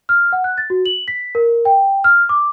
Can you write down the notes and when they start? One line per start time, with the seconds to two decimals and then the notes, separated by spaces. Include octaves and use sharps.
0.09 F6
0.33 F#5
0.44 F#6
0.58 A6
0.70 F#4
0.86 F#7
1.08 B6
1.35 A#4
1.65 G5
2.04 F6
2.29 D6